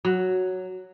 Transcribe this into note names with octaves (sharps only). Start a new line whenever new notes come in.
F#3